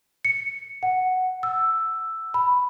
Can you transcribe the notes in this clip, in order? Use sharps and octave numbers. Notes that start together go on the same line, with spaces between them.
C#7
F#5
E6
B5